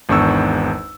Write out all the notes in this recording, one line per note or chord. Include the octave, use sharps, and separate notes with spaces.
G#1 E2 D4 C#6 E6